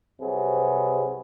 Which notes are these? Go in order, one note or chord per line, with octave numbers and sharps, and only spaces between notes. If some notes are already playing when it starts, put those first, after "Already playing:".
C2 C3 F#3 G#4 B4